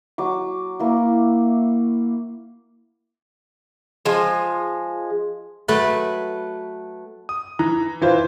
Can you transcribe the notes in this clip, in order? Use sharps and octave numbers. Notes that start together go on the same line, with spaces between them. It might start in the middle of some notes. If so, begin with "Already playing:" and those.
F#3 C#6 D6
A#3 E4
F3 G#3
F#3 A3 B4 B5
D#6
E3 A#5
E3 E4 F4 C5